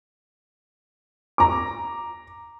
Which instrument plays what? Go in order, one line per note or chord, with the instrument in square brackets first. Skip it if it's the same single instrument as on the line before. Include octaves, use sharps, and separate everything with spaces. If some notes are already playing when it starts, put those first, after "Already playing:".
[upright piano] A#5 D6